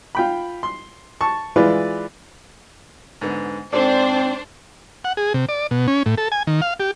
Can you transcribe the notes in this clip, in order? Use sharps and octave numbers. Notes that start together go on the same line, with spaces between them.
F4 G5 B5
C6
A5 C#6
E3 G#3 E4 F4 B4 D5
G#2 D3 B3
G#2 C4 D4 A4 C5 D5
F#5
G#4
C3
D5
B2
C#4
A2
A4
G#5
D#3
F5
G4